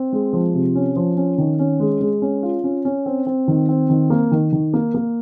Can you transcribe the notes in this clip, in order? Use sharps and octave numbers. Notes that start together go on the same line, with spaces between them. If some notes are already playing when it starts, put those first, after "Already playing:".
Already playing: C4
G#3
F3
C3
C#4
F3
C#4
D#3
C#4
G#3
G#3
C#4
F4
C#4
C#4
C4
C4
D#3
C4
D#3
A#3
D#3
D#3
A#3
A#3